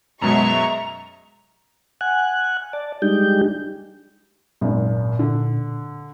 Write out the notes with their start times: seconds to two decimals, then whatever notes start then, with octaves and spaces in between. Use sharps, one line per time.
0.22 F#2 B2 F#3 G#3 E5 A#5 C#6
2.01 F#5 G#5 F#6
2.73 D5 A5
3.02 G3 G#3 D4 D#4 G4 G6
4.61 G#1 F#2 A#2
5.19 D3